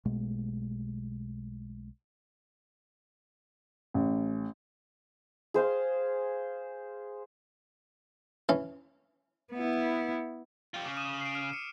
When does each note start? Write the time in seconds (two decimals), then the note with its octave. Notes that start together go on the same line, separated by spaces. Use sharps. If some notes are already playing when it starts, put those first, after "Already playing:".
0.05 B1 B2 G#3 A3
3.94 A1
5.54 G#4 C5 F5
8.49 E3 C#4
9.53 B3 E4
10.74 F4 G4
10.85 C#3 D6
10.97 D#6 D#7 E7
11.21 C7 D7
11.35 F6
11.53 C#7